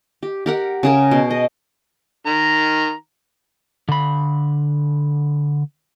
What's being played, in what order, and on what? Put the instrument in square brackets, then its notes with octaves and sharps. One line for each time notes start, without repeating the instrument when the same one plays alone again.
[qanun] G4
G4 A#4 F#5
C#3 G#4 A#4
B2
D#5
[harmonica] D#3 A#5
[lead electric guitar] D3 B5